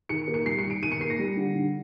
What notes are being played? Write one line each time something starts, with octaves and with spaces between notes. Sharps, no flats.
D#3 C#7
A#3
C#7
G3 C7
C#7
D#3
D7
D#3 D#7
C#7
A#3 C7
A#6
G3
D3
D3